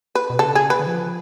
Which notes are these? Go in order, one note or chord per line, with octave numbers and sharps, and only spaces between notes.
B4
B2
C#3 A4
G#4
B4
D3
F3